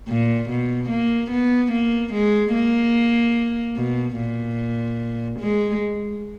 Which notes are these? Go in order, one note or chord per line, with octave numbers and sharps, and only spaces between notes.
A#2
B2
A#3
B3
A#3
G#3
A#3
B2
A#2
G#3